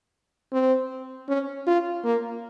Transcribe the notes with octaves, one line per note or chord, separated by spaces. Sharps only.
C4
C#4
F4
A#3